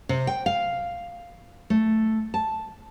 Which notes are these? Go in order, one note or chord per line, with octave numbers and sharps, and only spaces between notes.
C3
G5
F5
A3
A5